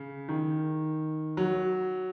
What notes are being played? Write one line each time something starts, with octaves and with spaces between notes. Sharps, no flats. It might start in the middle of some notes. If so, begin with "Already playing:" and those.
Already playing: C#3
D#3
F#3